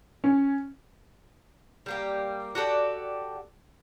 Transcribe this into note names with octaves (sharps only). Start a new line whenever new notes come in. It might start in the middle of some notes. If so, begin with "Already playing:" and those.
C#4
G3 A#3 G4
F#4 G4 A4 D5